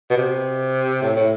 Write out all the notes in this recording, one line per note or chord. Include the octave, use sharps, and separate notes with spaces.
B2
C3
A2
A2